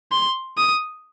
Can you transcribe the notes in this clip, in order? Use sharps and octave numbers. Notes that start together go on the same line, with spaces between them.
C6
D#6